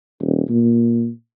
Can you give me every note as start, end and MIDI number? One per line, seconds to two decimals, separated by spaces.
0.20 0.42 27
0.50 1.09 46